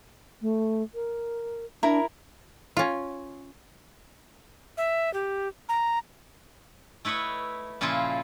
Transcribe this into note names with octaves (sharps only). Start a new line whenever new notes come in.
A3
A#4
D4 E4 A#4 A#5
C#4 F4
E5
G4
A#5
A3 E4 B4 C#5 D#5
A#2 C#3 F3 E4 F4